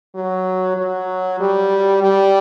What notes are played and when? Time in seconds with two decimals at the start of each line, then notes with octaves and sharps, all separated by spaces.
0.15 F#3
0.77 F#3
1.40 G3
2.02 G3